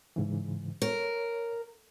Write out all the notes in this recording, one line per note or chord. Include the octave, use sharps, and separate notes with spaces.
G#2 C#3 E3
A#4 C#5